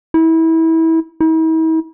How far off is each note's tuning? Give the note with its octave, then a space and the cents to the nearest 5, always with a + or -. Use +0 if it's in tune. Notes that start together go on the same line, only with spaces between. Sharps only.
E4 -25
E4 -45